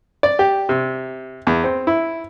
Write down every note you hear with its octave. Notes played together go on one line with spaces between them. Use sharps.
D5
G4
C3
E2
C4
E4